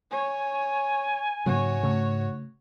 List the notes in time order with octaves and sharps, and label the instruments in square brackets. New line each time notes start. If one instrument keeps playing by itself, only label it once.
[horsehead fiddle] C#5 [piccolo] G#5
[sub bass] G#2 [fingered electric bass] C#3 F#3 A#3 [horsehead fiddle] F#4 C#5
[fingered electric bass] C#3 A3